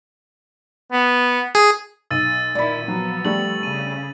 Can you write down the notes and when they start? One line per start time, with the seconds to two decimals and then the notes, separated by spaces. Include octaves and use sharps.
0.92 B3
1.55 G#4
2.11 B1 E6 A6 D#7
2.55 A#2 D#3 E4 D5 B5
2.88 F3 F#3 B3
3.25 G3 A3 D4 F#7
3.63 C#3 D#7